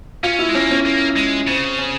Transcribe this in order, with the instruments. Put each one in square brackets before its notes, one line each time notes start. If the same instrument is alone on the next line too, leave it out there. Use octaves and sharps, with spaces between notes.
[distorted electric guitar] C#4 [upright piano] F4
[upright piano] E4
[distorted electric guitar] G#3
[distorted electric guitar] A#3 [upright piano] C#4
[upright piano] C#4
[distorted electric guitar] A#3
G#3
[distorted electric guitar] C#3 [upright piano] C4
[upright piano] C#4